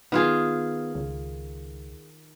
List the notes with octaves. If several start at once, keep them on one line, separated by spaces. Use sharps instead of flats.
D#3 B3 F4 G#4
C#2